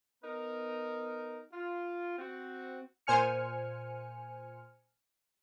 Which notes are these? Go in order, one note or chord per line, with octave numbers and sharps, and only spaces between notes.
B3 D#4 A#4
F4
C4 F#4
A#2 C5 G#5 F6 C#7